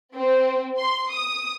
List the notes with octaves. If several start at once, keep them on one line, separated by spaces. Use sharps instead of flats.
C4
C6
D#6